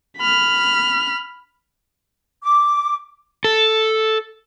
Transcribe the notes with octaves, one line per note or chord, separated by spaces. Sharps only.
B5 F6
D6
A4